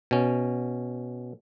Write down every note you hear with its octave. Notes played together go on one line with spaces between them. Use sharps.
B2 C#4